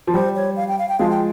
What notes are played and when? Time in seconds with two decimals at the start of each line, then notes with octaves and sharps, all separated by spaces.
0.07 F3
0.14 G3 C5
0.36 C#5
0.57 F5
0.68 G5
0.79 F5
0.89 G5
0.99 F3 G#3 F5
1.10 G5